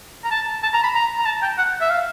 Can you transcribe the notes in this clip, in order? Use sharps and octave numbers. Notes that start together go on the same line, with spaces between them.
A#5
A5
A5
A#5
B5
A#5
A#5
A5
G5
F#5
E5
F5